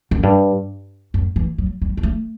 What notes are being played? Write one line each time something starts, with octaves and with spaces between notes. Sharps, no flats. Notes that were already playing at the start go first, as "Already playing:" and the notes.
F#2
G2
F#2
E3
F#3
G3
G3
A3